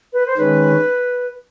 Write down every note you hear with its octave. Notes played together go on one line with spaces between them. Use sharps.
B4
C5
D#3 G#3 C#4 B4